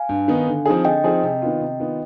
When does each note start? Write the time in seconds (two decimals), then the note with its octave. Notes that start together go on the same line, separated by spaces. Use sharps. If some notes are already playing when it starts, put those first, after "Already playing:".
Already playing: F5 G#5
0.09 G2
0.28 D#3 B3 D#4
0.47 D3
0.66 F3 C4 D#4 G#4
0.85 D3 D#5 G5
1.04 F3 C4 D#4 G#4
1.23 C3
1.42 D#3 B3 F4
1.61 C3
1.79 D#3 B3 F4